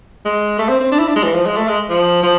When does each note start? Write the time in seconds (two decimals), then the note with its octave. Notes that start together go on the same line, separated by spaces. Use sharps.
0.25 G#3
0.59 A3
0.69 C4
0.80 C4
0.92 D4
0.99 E4
1.08 D4
1.16 G#3
1.24 E3
1.34 F3
1.46 G#3
1.57 A3
1.68 G#3
1.90 F3
2.23 F3